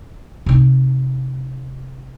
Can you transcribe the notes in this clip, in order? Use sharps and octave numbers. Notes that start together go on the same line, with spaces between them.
C3 D#4